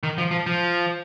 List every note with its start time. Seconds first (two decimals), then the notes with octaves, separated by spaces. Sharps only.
0.04 D#3
0.18 F3
0.31 F3
0.47 F3